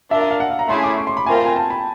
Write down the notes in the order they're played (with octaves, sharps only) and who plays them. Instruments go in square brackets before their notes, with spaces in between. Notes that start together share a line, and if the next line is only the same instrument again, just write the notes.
[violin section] D4 F4 A#4 [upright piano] E5
[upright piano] E5
F5
F#5
F5
A#5
[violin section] A3 C#4 E4 G#4 [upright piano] C6
[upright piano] D6
C#6
C6
B5
[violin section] A3 C4 F4 A#4 [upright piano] G#5
[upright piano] G5
G#5
A5
B5